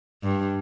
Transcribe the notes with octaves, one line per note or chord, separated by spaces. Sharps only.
G2